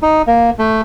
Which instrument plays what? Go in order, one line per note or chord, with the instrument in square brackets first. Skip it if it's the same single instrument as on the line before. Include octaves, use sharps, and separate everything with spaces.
[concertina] D#4
A#3
A3